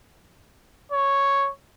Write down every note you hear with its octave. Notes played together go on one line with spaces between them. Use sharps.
C#5